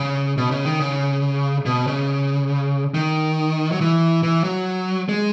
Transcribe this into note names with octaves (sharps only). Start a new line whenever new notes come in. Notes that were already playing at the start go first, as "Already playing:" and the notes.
Already playing: C#3
B2
C#3
D#3
C#3
B2
C#3
D#3
F#3
E3
E3
F#3
G#3